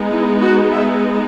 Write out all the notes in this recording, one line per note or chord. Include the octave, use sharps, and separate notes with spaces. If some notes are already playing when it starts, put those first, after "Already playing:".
Already playing: G#3 B3 D#4
E4
F#4
E5